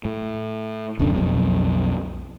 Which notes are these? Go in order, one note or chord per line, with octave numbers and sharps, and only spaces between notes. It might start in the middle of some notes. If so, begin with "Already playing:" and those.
A2
D1 B1 F#2 D3
B1 F2 B2